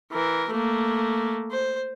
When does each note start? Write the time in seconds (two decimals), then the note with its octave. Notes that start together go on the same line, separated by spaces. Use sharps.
0.12 E3 A#4
0.51 A3 A#3
1.51 C5